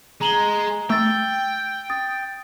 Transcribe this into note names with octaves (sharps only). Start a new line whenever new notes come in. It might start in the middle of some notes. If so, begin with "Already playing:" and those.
G#3 A#5 F#7 G7
A3 G5 E6 A6
D#6 A6